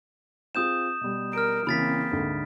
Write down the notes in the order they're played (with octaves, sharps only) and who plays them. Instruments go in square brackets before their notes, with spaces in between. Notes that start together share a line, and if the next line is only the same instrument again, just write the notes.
[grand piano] C4 F4 G#4 [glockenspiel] D#6 G6 E7
[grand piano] B2 G3
[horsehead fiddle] A#4 [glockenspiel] F6 D7
[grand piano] C#3 E3 [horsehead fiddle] A#3 C4 [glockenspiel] B5 A6 B6
[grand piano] D2 G#2 D3